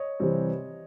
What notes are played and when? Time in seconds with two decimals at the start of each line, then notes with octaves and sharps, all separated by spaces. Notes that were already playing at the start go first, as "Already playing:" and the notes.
Already playing: C#5 D#5
0.20 C3 E3 G3 C4